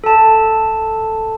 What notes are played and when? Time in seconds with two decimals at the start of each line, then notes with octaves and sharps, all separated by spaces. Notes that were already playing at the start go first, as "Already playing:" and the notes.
0.04 A4 A5